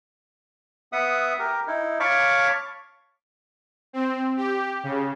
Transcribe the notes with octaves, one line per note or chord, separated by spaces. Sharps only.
B3 E5 F#5 D#6
G4 A#4
D#4 E4
C#5 F5 A5 B5 C#6 D6
C4
G4
C#3